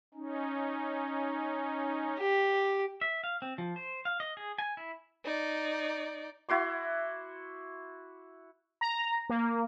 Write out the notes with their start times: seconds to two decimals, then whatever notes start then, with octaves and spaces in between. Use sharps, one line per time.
0.14 C#4 D#4
2.19 G4
3.01 E5
3.24 F5
3.42 C4
3.58 F3
3.76 C5
4.05 F5
4.20 D#5
4.37 G#4
4.58 G#5
4.77 E4
5.25 D#4 D5
6.49 E4 F#4 C6 D6
8.81 A#5
9.29 A#3